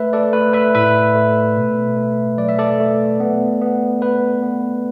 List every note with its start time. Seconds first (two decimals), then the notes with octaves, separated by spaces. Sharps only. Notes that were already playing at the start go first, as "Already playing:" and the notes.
Already playing: A3 B4 E5
0.13 A4 D5
0.33 A3 B4
0.53 B4 E5
0.75 A2 B4 E5
1.15 A3
1.57 B2
1.97 A3
2.38 F#3 D5
2.49 E5
2.59 A4 D5
2.80 A3
3.20 B3
3.61 B3
4.02 B3 B4
4.43 B3